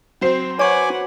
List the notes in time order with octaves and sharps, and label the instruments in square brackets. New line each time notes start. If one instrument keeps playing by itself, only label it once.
[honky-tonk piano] F#3 C5 C7 [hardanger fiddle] C4
[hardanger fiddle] B4 F#5 [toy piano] C#5 C#6 [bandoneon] G#5 D6